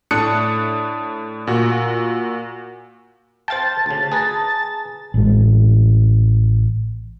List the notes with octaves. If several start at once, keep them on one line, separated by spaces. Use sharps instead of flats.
A2 D4 A5 D#6 F#6 C#7
A#2 F#4
C5 F5 G5 A5 A6
D2 C#3
G#4 B4 A#5
A1 G#3